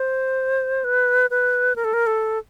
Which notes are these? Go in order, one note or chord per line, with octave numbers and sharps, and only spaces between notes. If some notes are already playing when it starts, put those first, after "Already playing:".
Already playing: C5
B4
B4
A#4
A4
A#4
A4